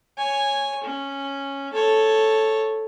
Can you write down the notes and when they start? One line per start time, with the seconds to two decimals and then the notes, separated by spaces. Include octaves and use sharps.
0.18 C#5 G#5
0.84 C#4
1.73 A4 C#5